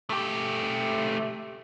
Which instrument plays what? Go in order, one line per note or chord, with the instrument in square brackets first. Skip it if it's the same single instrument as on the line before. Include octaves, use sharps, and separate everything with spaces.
[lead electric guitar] A3 G4